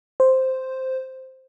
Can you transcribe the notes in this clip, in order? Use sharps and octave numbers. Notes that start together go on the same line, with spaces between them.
C5